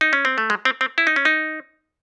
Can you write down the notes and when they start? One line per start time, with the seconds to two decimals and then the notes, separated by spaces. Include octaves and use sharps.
0.01 D#4
0.13 C#4
0.25 C4
0.38 A3
0.50 G#3
0.65 C4
0.81 C4
0.98 E4
1.07 D#4
1.16 C#4
1.25 D#4